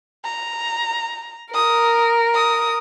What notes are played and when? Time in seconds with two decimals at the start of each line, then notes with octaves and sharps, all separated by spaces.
0.25 A#5
1.54 A#4 D#6
2.34 D#6